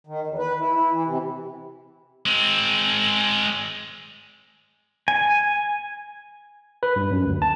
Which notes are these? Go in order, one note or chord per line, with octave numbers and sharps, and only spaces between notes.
D#3
E2
B4
E4
E4
E3
C3
G#3 C4
G#5
B4
G2
F#2
D2
A5